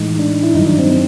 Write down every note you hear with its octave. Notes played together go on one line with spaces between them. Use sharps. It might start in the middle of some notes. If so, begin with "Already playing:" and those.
Already playing: A2 E3 G#3 D#4
D4
E4
G2 D#3 F#3 D#4
D4
C4
C4